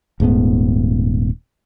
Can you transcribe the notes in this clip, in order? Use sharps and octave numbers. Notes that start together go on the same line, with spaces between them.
D#1 G#2 A3 B3